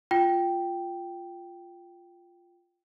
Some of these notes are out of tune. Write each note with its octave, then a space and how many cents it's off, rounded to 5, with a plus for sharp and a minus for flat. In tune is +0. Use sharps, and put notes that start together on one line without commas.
F4 +0 G5 -5